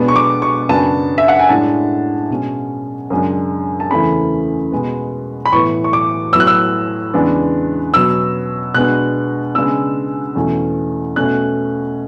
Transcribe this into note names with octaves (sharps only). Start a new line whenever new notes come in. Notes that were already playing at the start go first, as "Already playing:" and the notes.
Already playing: B2 G#3 B3 D4
C#6
D6
C#6
F#2 C#3 F#3 B3 D4 A5
E5
F#5
G#5
A2 G#3 D4 A5
B2 G#3 C#4
F#2 C#3 G#3 D4
A5
E2 C#3 E3 A3 C#4 B5
B2 G#3 B3
B5
A2 E3 B3 C#6
C#6
D6
A2 F#3 B3 E6
F#6
E6
E2 C#3 G#3 B3 D4
B2 F#3 B3 E6
B2 G#3 B3 D4 F#6
C#3 G#3 B3 D4 E6
E2 B2 A3 C#4
B2 A3 C#4 F#6